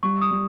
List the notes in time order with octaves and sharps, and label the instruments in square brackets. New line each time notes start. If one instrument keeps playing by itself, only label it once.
[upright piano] G3 [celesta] C#6
[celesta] D#6
[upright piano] G3